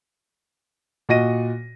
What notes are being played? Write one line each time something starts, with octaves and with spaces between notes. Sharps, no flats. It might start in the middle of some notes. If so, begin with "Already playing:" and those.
A#2 F#4 D#5 A#6 D#7